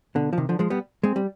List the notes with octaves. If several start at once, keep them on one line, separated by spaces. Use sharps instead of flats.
B2 D3
F3
C3 D#3
D3 F3
F3 G#3
G3 B3
G#3 C4
G3